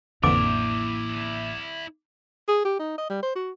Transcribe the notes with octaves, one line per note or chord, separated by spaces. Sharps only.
A1 F2 D3 E3 A#3 E4 D5 D6
G#4
G4
D#4
D#5
G3
C5
F#4